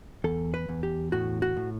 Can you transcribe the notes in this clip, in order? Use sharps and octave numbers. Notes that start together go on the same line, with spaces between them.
E2 A4
B4
E2
G4
A2 F#4
F#4
A2